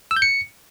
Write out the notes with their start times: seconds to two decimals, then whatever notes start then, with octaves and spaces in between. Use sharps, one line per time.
0.11 E6
0.16 G6
0.22 C#7